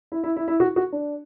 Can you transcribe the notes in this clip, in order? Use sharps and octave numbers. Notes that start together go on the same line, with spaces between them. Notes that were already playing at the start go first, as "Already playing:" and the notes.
E4
E4
E4
E4
F#4
F#4
D4